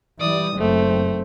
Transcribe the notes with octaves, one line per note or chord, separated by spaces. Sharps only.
E3 G3 D5 D#6
F#1 A3 C4